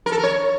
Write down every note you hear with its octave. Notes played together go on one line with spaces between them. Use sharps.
A#4
A4
A#4
C#5